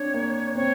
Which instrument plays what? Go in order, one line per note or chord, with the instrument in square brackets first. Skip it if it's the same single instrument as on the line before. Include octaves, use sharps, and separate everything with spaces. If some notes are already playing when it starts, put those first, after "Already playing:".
Already playing: [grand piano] C4 D4 [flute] C#5
[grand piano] A#3
[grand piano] C4 [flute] C#5